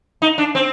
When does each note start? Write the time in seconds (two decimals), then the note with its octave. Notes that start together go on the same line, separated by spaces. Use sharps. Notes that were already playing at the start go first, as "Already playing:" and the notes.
0.22 D#4
0.38 D4
0.55 C4